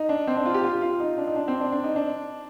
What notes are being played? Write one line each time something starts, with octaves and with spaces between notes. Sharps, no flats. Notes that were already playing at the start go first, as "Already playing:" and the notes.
Already playing: D#4
D4
C4
D4
F4
G4
F4
F4
D#4
D4
D#4
D4
C4
D4
D4
D#4
D4